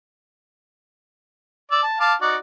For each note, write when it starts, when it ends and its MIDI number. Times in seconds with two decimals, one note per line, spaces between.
1.71 1.82 74
1.71 1.82 88
1.83 1.98 81
2.00 2.14 77
2.00 2.14 81
2.00 2.14 86
2.21 2.36 63
2.21 2.36 66
2.21 2.36 74